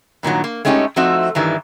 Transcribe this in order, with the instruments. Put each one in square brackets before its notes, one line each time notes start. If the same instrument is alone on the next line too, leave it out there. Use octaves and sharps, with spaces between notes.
[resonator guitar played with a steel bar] G2 A#2 D#3 F#3
A#3
G#3 A3 C#4 D#4 F4 G4
F3 A3 C4 D#4 F#4 E5
G2 D#3 E3 G3